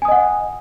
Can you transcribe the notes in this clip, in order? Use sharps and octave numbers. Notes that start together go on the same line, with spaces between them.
D#5 F#5 G#5 D#6